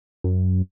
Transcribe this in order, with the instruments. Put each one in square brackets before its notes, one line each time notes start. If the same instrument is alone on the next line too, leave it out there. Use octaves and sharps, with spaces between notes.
[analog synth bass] F#2